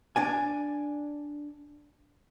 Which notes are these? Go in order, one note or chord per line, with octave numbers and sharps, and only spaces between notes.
D4 D5 G#5